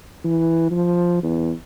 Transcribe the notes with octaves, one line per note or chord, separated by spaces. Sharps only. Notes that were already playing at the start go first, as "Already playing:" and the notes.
E3
F3
E2